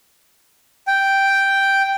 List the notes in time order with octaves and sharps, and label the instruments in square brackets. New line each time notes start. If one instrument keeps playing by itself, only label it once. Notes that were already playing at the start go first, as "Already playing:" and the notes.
[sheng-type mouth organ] G5